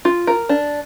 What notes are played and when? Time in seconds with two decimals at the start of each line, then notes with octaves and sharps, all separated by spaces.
0.05 F4
0.27 A#4
0.49 D4